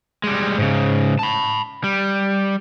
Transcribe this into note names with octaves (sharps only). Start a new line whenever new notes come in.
G3 G#3
G#2 C#3
A5 B5
G3